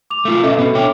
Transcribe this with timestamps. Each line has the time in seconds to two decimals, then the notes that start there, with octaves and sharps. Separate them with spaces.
0.10 D6 F7
0.25 A3 F4
0.43 B2 C#4 A4 D#5 E5
0.59 B2 B3
0.75 D4 C#5 G5 D6